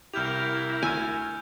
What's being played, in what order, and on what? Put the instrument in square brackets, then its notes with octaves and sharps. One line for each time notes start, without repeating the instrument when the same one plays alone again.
[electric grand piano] C2 G4 [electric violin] E4 A#4 [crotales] F6 G6 F7
[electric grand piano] D2 E6 D#7 [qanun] G#5